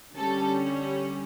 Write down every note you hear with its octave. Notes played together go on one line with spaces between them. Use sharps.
D3 G3 C#4 A4